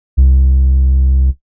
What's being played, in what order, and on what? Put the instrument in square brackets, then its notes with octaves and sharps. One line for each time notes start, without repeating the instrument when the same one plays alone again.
[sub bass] C2